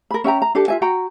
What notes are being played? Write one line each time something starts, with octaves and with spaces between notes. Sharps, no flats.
A#4 B5
C#4 E5 G5 A#5
A#5
D4 G4 A4
F4 E5 G#5
F#4 F#5 G5 A#5